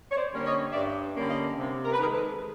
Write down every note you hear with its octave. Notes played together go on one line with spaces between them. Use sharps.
C#5
C5 D5
D3 G3 A#3 C#4
C#5 D#5
G2 D5 E5
D3 G3 A#3 C#4
D#5 F5
C3
A#4
B4
D#3 G#3 G#4 A#4
A4 B4